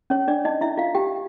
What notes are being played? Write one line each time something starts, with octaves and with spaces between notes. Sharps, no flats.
C#4 C#5
D4 D5
D#4 D#5
E4 E5
F4 F5
G4 G5